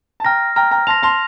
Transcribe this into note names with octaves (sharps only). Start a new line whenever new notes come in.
A5
G5 A#5 F6 A#6
G5 A#5 F6
G5 A#5
A5 C6 A#6 F7
A5 C6